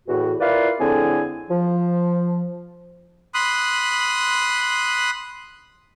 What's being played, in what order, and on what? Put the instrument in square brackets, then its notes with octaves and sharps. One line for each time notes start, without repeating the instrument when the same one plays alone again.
[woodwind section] E2 A2 F#4
E4 F4 A#4 B4 D5 F5
F2 A2 D3 C4 G#4 G#5
F3
[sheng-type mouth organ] B5 C6 D#6 F#6